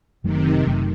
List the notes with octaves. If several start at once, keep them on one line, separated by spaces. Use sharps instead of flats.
F#1 F#2 C3 D#3 F#3 A3
F#1 F#2 F#3 A3